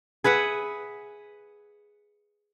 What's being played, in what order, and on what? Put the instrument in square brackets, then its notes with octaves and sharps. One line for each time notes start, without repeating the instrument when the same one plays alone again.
[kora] G#4 B4 E5 F#5